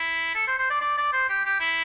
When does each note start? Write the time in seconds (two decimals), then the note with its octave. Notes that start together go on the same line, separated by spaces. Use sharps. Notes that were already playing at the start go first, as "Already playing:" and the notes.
Already playing: E4
0.35 A4
0.47 C5
0.58 C5
0.70 D5
0.81 D5
0.98 D5
1.13 C5
1.29 G4
1.45 G4
1.60 E4